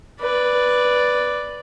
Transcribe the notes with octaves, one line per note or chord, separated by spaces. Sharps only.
B4 D5